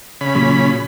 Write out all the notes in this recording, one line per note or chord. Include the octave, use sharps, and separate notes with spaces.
C#3 B5
A#2 F#3